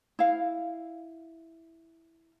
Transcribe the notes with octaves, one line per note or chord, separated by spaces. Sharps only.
E4 F5